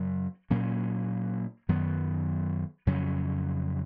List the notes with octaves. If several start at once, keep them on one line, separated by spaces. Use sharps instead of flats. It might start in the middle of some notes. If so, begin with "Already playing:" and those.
Already playing: F#2 C#3 F#3
A#2 F#3 A#3 C#4
F#2 D#3 F#3 B3
F2 C#3 F#3 C#4